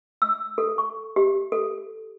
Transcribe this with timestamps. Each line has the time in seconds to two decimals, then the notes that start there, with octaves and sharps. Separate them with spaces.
0.22 E6
0.58 A4
0.78 C#6
1.16 G4
1.52 A4